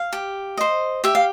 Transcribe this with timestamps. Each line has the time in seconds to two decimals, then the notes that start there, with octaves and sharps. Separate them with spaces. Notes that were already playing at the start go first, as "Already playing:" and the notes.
Already playing: F5
0.13 G4
0.57 C5 D#5
1.04 G4 E5
1.15 F5